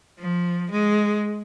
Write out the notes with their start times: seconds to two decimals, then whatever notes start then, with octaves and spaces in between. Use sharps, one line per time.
0.19 F3
0.71 G#3